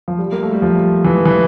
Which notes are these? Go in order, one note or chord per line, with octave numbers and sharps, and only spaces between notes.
F3
G3
A#3
A3
G3
F3
E3
E3